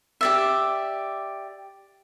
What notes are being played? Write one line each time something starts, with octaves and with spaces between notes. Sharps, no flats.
G4 D5 E5